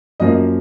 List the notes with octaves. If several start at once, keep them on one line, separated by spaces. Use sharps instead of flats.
F#2 F3 A#3 D#5